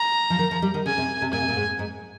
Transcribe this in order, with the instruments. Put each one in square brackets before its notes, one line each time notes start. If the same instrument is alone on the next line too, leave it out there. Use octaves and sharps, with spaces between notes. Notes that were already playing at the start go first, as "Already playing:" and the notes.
Already playing: [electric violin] A#5
[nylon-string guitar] F3
D#3
F3
G3
D#3
[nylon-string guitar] C#3 [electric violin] G#5
[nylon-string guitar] C3
C3
[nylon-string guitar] A#2 [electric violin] G#5
[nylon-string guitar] C3
A#2
G#2
G#2